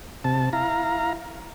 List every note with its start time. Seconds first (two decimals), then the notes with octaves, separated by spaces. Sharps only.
0.24 C3 A5
0.53 E4 F5 A#5